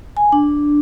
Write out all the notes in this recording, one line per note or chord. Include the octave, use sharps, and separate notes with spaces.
G#5
D4